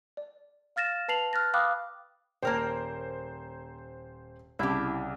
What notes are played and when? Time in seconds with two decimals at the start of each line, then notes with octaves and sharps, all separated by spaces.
0.17 D5
0.76 F5 F6 A6 A#6 E7
1.08 B4 A5 C7 F7 F#7
1.33 F6 F#6 A6 A#6
1.54 F5 G5 B5 D6 D#6 F#6
2.43 D#1 A#3 A#4 C5 G5
4.59 C2 C#3 E4 G4